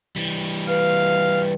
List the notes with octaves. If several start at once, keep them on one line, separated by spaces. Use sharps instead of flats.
E3 G3
B4 F5